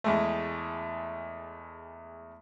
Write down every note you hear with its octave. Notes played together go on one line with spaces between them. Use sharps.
E2 G#3 A3